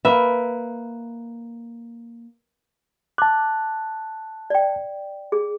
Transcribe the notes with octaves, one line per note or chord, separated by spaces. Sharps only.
A#3 B4 E5
A5 D6 F#6
D5 G5
G#4